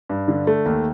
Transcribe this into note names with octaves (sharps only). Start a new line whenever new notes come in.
G2
D3
A3
D#2